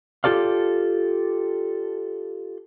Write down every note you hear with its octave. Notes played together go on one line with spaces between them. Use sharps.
F4 G4 A4 D5 F5